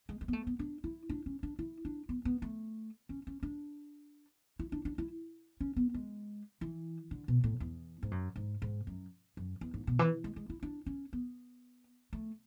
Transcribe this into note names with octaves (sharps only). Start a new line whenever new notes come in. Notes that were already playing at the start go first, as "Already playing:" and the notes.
G#3
G#3
B3
A3
B3
D4
E4
D4
C#4
D4
E4
D4
B3
B3
A3
C#4
C#4
D4
E4
D4
D4
E4
C#4
B3
G#3
E3
D3
B2
A2
E2
G#2
F#2
G#2
G#2
F#2
F#2
E2
G#2
B2
E3
G#3
G#3
E4
D4
C#4
B3
A3